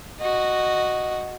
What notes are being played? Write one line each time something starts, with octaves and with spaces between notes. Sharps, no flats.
F#4 D#5